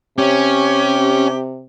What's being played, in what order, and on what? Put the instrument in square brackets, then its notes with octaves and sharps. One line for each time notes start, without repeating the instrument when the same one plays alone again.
[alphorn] C3 [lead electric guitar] C#4 [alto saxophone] G4